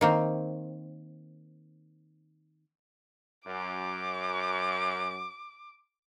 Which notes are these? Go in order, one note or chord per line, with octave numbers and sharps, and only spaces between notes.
D#3 A#3 C4
F#2 D6